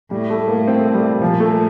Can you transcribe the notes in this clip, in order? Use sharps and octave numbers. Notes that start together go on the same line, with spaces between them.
A2 G3
A3
A#3
C4
G3
A#2 F3
A3